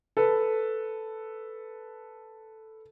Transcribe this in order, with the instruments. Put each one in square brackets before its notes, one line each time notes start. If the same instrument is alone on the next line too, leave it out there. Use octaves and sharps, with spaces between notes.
[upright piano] A4 B4